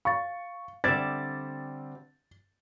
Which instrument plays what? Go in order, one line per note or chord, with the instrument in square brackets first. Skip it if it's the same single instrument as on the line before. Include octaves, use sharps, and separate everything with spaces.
[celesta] F5 A6 [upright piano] C#6
[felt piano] D3 C4 [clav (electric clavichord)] G3 D5 E5 [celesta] G#6 E7 [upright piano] A6